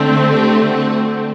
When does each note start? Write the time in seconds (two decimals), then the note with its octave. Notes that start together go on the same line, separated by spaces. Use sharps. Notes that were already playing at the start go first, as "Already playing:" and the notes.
Already playing: D3 A3 C4
0.29 G4
0.68 F#4